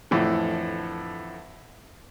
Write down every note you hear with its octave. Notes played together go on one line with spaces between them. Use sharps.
F2 A2 D3 E3